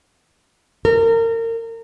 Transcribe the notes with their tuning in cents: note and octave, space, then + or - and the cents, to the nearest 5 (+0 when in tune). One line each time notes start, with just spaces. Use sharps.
A#4 -30